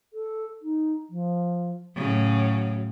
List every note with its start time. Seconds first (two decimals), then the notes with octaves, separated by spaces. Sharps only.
0.13 A4
0.62 D#4
1.10 F3
1.95 A2 C#3 F#3